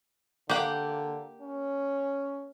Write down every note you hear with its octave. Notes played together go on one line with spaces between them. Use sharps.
D3 A#3 G4 F#5 G5
C#4